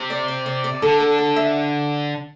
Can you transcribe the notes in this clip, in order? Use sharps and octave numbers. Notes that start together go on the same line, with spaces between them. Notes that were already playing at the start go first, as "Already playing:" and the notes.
Already playing: C3
D5
D5
D5
D5
D3 A4
A4
A4
E5